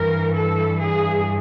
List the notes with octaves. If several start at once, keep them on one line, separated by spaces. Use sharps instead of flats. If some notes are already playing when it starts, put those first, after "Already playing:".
Already playing: G2 E3 A#4
A4
G#4